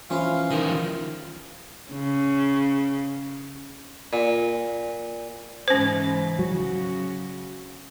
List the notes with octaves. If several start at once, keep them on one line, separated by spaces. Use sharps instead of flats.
E3 F3 C#4 B4 F5
D#3 F3 A#4
C#3
A#2
G#2 C#3 E3 C#4 C5
C#3 F#3 F#4